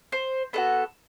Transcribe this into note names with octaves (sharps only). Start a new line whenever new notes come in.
C5
B3 D4 F#4 A4